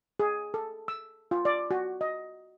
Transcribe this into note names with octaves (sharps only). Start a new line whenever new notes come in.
G#4
A4
E6
F4
D5
F#4
D#5